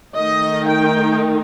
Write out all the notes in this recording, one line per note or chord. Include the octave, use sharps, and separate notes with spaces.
D#3 A3 D#4 D#5
G5